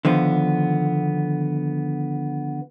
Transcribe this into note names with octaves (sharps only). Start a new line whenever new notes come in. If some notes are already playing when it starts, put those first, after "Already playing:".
D3 D#3 F3 B3